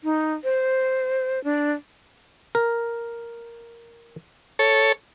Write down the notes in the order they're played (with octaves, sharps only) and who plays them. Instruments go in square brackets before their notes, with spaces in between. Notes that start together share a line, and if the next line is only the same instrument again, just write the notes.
[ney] D#4
C5
D4
[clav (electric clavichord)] A#4
[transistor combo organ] A4 C#5